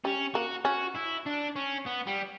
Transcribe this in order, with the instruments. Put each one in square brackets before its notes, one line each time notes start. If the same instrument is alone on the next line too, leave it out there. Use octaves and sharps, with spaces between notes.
[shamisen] G3 [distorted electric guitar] C#4
[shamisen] A#3 [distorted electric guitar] F#4
[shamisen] C#4 [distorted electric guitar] F#4
[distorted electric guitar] E4
D4
C#4
B3
G3